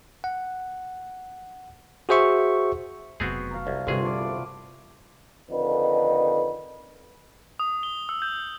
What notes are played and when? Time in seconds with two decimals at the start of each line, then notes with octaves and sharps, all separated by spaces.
0.24 F#5
2.09 F#4 G#4 C5 E5 C#6
3.20 F1 B2 F#3 B3 C4 F#4 G#4
3.51 F5 A5 A#5
3.67 C2
3.87 G1 C2 C3 G3 C4 F4 F#4 G#4
4.02 A3 D5
4.18 B3
5.51 F2 D3 D#3 D#4 B4
7.60 D#6
7.83 G7
8.09 E6
8.22 G6